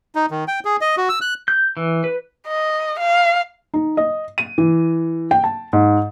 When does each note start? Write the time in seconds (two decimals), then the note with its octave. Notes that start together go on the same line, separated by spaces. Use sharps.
0.15 D#4
0.31 D#3
0.48 G5
0.65 G#4
0.81 D#5
0.97 F#4
1.09 E6
1.21 F#6
1.48 G6
1.77 E3
2.04 B4
2.47 D#5
2.99 F5
3.74 D#4
3.97 D#5
4.38 D#7
4.58 E3
5.31 G5
5.44 A5
5.73 G#2